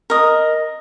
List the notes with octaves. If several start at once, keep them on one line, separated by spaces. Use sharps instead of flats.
A#4 D#5